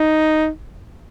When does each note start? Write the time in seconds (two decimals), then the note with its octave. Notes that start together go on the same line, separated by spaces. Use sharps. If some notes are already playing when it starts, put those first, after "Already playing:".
Already playing: D#4